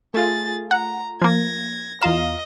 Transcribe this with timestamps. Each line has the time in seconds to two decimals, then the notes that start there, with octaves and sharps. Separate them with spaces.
0.14 A3 F4 G#4 A6
0.71 F#5 A#5
1.22 F3 A#3 G#6 A#6
2.01 E2 F4 D#5 F5 A#5 E7